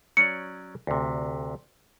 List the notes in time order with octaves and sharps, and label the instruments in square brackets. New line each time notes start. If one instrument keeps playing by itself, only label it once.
[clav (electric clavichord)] F#3 C#4 D5 [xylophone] C#7
[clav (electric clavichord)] D2 C3